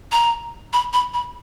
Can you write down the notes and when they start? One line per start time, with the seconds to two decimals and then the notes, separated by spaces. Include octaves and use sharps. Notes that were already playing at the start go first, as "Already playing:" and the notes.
0.12 A#5
0.73 B5
0.93 B5
1.14 B5